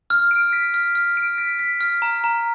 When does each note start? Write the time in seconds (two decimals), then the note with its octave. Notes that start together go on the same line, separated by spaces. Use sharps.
0.10 F6
0.31 D7
0.53 B6
0.74 F6
0.95 F6
1.17 D7
1.38 B6
1.59 B6
1.81 F6
2.02 A#5
2.24 A#5